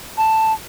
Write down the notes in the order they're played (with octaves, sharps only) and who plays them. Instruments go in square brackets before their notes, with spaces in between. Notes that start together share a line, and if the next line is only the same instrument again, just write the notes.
[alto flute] A5